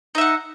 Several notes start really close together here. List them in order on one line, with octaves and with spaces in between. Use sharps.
D#4 E5 F#5